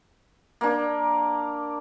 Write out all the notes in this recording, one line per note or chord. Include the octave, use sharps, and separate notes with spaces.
A#3 D4